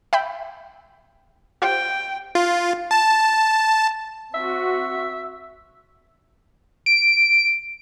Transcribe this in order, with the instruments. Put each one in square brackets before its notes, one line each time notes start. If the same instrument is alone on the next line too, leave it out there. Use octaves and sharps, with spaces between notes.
[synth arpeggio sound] E5 G5 B5
[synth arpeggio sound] F4 G4 C5 [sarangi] G5
[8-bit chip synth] F4
A5
[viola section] C4 F#4 [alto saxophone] E5
[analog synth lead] D7